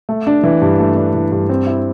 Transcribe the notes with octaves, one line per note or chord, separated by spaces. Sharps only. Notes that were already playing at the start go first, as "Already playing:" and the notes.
A3
D4
E3
G2
A3
D4
E3
G2
C4
E4